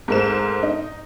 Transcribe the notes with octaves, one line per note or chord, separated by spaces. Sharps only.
G#2 A3 A#4 C5 E7
D#4